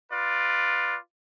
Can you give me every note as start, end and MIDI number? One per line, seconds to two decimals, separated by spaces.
0.12 0.98 65
0.12 0.98 71
0.12 0.98 74